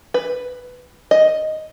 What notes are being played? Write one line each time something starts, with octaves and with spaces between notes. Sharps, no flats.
B4
D#5